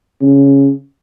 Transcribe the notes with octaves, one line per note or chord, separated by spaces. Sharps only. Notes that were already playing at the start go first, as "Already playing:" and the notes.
C#3